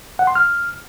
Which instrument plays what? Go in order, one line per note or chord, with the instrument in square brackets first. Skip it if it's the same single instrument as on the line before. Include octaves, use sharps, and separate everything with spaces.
[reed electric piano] F#5
C6
F6